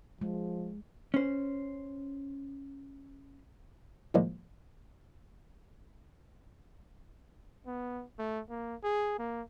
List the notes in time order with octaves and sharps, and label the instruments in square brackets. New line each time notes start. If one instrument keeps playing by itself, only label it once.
[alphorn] F3 [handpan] G#3
[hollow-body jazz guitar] C#4 C5
[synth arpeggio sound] A2 D#3 F3 G3 G#3 A#3
[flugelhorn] B3
A3
A#3
G#4
A#3